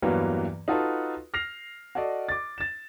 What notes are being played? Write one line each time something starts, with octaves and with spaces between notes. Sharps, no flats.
E2 G2 E3 F#3 A#3 B3
D#4 F4 F#4 A4 B4
F6 A#6 C7 F7
F#4 A4 D5 D#5
D6 A6
A6 E7